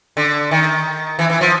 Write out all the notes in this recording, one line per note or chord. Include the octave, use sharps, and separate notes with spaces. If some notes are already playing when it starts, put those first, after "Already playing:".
D3
D#3
E3
E3
F3